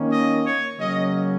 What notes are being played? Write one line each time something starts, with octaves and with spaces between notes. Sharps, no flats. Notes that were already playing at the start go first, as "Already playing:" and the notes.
Already playing: D#3 A#3 C#4
D#5
C#5
C#3 F#3 A#3 C#4 D#5